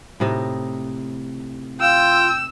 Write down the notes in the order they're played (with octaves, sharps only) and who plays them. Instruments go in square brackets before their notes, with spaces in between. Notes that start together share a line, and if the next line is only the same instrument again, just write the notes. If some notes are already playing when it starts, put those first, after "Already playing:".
[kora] A2 C3 D#4
[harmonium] F4 [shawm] G5 [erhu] E6